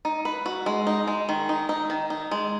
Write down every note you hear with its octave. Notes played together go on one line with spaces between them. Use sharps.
D#4
B4
F#4
G#3
D#4
G#3
D#3
D#4
D#4
D#3
D#4
G#3